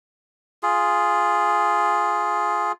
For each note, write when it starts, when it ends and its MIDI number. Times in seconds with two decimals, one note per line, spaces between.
0.63 2.72 65
0.63 2.72 68